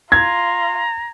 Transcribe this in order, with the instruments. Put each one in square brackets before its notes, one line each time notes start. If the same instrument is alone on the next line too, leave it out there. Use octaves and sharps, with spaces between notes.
[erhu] F4 [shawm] A#5 [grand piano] G#6